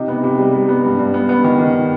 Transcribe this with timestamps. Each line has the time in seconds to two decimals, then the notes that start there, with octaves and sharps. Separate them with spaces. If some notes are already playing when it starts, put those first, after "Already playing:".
Already playing: C3 D#4
0.08 B3
0.24 C3
0.39 G3
0.53 G3
0.69 B3
0.84 G2
0.99 G2
1.14 B3
1.29 B3
1.44 D#3
1.60 D#3